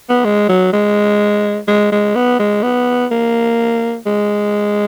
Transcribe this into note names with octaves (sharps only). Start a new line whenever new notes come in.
B3
G#3
F#3
G#3
G#3
G#3
B3
G#3
B3
A#3
G#3